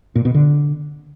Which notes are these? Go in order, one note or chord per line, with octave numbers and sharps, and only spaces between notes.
A#2
B2
D3